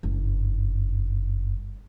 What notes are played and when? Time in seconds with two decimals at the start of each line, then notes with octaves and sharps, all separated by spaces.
0.03 F#1 G2